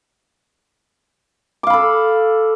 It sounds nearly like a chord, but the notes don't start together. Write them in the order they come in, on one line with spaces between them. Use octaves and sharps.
D6 F5 B5 A4